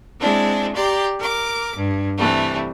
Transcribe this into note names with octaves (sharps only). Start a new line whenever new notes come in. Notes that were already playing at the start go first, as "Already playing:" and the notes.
G#3 C4 D4 E4
G4 D5 A#5 C6
A#4 D6
G2
C3 E3 G3 A3